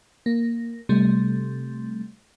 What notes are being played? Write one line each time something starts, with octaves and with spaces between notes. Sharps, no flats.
A#3
C3 G3 A3